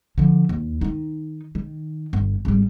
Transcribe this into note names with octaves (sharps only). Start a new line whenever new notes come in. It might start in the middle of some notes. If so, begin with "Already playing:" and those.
D3 F3
D#2
D#3 D#4
D#3
G1
G#1 G3